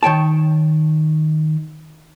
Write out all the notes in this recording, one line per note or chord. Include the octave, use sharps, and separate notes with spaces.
D#3 C#5 G5 A5